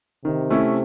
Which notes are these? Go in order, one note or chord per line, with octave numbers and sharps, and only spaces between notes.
C3 D#3
A3 C#4 E4